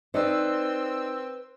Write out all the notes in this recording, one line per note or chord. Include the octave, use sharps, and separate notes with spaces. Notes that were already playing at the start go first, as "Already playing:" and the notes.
C4 D#4 B4 C5 D5 E6